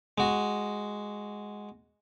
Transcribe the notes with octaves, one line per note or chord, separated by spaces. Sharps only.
G#3 F#4